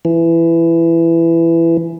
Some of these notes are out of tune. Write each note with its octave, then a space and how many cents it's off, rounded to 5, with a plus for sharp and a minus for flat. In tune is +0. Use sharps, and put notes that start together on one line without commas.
E3 +15